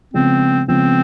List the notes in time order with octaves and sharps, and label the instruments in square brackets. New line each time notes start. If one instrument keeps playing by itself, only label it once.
[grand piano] C#3 F3 G#3 B3 [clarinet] C4
[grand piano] C#3 F3 G#3 B3 [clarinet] C4